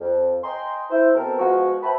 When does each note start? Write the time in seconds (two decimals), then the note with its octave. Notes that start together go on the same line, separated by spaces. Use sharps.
0.01 F2
0.44 D#5 G5 G#5 A#5 C6
0.90 E4 C5
1.15 B2 C4 A4 A#4
1.39 F3 G#3 B3 F4 F#4
1.83 C5 E5 F#5 G5 A5 B5